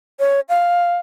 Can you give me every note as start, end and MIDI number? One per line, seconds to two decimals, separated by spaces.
0.19 0.40 73
0.49 0.97 77